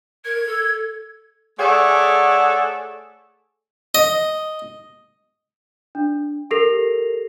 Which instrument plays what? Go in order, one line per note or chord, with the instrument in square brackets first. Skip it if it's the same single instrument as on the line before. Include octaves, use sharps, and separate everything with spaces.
[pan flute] A#4 [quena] G#6
[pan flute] A4
[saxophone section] A3 G#4 A4 C#5 D5 F#5
[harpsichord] D#5
[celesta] D4
G4 A4 A#4 A#6 C7 F7